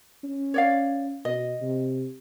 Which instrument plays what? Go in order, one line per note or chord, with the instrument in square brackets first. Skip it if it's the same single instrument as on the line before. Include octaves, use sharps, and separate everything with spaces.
[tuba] C#4
[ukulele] C#5 D5 F5
[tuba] B2 [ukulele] D#5
[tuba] C3